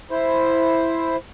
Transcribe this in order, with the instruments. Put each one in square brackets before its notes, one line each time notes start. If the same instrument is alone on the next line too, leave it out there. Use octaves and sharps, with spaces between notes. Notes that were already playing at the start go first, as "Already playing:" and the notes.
[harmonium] E4 C5